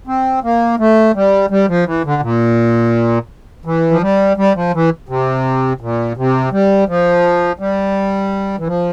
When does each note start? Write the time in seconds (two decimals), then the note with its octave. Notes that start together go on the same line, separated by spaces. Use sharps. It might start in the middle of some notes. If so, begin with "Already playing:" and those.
0.07 C4
0.43 A#3
0.79 A3
1.15 G3
1.50 G3
1.68 F3
1.86 E3
2.05 D3
2.22 A#2
3.65 E3
3.91 F3
4.01 G3
4.37 G3
4.56 F3
4.74 E3
5.09 C3
5.81 A#2
6.17 C3
6.52 G3
6.88 F3
7.59 G3
8.59 E3
8.67 F3